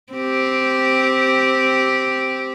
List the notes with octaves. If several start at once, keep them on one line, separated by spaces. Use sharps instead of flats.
C4 G4